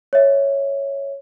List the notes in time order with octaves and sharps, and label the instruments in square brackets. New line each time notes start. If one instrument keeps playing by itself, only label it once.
[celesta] C#5 E5